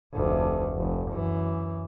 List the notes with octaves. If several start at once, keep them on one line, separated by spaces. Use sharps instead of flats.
F1 D2
F1
F#2 E3